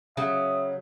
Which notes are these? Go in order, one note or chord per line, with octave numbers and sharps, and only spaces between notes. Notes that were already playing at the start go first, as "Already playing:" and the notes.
C#3 F#3 E5 D#6